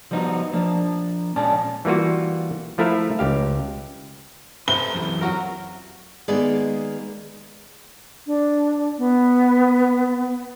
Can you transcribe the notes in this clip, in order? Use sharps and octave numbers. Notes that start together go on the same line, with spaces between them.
F3 G3 B3 D#4 F#4
F3 A#3 D4
A#2 G#3 C#4 C#5 D5 A5
E3 G3 A#3 F4 F#4
F3 A3 E4 A#4 F5
C#2 G4 F5
C3 A4 B4 G7
F#2 E3
F#3 F#4 A#4
D#3 G#3 A#3 B3 G#4 D5
D4
B3